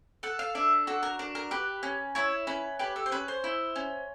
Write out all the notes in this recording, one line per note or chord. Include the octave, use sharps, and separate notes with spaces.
A4 F#5
F5
D4 E5
F#4 A4
A#4
D4 A#4
A#4
G4 B4
C#4
E4 C#5
C#4 B4
G4 B4
A4
C5
C#4 B4
C5
E4
C#4